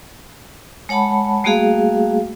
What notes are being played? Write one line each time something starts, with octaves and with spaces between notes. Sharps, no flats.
G#3 C#5 F#5 A5 B5
G3 A3 A#3 F#4 G#4 F5